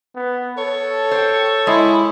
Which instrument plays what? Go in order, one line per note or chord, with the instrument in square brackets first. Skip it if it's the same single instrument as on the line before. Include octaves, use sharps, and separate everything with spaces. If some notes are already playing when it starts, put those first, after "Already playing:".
[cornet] B3
[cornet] A4 [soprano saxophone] C#5
[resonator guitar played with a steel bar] C5 G5
[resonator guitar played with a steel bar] G#3 [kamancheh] E4